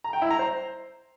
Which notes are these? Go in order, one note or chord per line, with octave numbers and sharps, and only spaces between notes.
A#5
G5
E4
A#5
C5